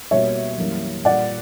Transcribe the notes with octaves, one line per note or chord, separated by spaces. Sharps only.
B2 G3 A#3 C#5 E5
F#2 E3 G3 A#3
A#2 G3 A#3 D5 F#5